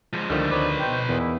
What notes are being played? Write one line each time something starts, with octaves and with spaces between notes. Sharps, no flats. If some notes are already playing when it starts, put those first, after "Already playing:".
F3 G#3
C#2 D3 D#3 F3 G3 A3
D2 C4 D#4 B4 C#5 D5
B2 D#4 C5 G5
E2 D#3 E4